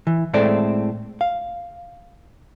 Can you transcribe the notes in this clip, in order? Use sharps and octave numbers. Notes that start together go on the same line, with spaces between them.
E3
A2 G#3 A3 C4 A4 D5
F5